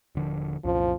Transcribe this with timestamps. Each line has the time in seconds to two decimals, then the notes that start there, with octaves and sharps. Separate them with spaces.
0.15 D#1 D3 F3
0.65 C2 F#2 A#2 F3